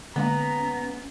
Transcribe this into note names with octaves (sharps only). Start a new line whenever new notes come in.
D3 G#3 A#3 B3 C#4 A#5